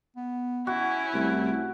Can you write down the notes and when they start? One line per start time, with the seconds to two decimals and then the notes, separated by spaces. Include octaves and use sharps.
0.16 B3
0.67 C#4 E4 F#4
1.14 C2 A3